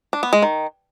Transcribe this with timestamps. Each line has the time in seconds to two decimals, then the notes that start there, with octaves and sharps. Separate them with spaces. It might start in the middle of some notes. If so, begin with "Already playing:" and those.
0.13 D4
0.23 B3
0.33 G#3
0.42 D#3